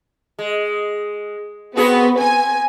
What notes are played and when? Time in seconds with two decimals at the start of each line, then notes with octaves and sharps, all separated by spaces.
0.39 G#3
1.77 B3 C4 F#4 G#4
2.21 C4 G#5